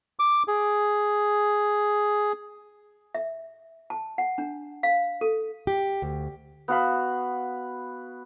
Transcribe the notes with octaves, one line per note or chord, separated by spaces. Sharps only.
D6
G#4
E5
A5
F#5
D4
F5
A4
G4
D2
B3 F#4 F5 B5